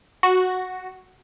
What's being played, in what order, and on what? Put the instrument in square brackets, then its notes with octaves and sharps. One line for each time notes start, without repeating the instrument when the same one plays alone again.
[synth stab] F#4